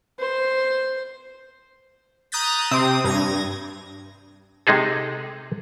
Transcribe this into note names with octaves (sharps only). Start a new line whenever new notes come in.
C5
A#5 D#6 F#6 G6 A6 B6
C3 C4 D#6
G2 G#6 A#6
C3 G#3 D#4 G#4 A4